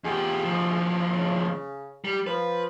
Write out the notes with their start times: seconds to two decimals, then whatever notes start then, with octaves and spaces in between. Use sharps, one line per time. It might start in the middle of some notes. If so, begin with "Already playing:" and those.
0.04 E2 D#4 F4 G4 G#4
0.45 D#2 F3
1.12 C#3
2.05 G3
2.27 F3 B4